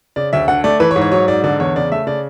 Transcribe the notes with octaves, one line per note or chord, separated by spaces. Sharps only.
C#3 D5
D2 E5
D3 F#5
A3 D5
E3 B4
C#5
G#2
C#5
F#3 C#5
G#2 D5
D3 D5
E2 C#5
C#3 D5
A3 E5
C#3 D5